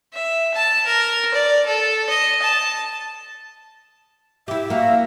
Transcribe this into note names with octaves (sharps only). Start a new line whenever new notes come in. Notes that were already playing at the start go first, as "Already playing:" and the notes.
E5
A5
A#4
D5
A4
D#5
A5
E4 G4 E5
A#3 F#4